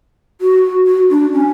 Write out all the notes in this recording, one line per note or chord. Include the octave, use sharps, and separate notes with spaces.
F#4
F#4
D4
C#4